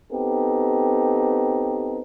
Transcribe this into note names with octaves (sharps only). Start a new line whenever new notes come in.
B3 C4 D#4 G4 A4